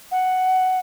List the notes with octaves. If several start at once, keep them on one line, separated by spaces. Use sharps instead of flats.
F#5